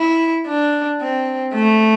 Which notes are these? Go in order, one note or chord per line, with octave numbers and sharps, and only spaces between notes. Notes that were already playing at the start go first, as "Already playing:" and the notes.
Already playing: E4
D4
C4
A3